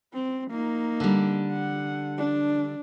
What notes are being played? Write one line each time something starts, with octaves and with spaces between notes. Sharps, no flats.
C4
A#3 D#4
D3 G3
F#5
D4